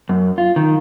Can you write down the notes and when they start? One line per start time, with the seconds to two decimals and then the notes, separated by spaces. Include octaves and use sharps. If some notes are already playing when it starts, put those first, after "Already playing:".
0.09 F#2
0.38 F4
0.56 D#3